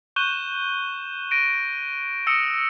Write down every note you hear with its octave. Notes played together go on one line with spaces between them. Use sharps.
C#6 F#6 G6 D#7 E7 G7
A#6 D7 D#7
D#6 E6 A#6 C#7 E7